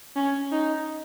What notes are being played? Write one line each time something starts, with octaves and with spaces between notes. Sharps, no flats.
C#4
D#4